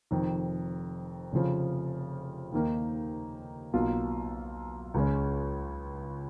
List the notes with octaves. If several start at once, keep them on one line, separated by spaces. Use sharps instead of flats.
F1 F2 D#3
F1 F2 C#3 F3
D#2 D#3 A#3 D#4
B1 B2 F#3 A#3 F4
C#2 C#3 G#3 C#4